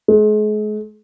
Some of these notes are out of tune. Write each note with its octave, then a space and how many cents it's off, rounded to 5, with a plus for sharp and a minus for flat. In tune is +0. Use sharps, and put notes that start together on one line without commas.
G#3 +40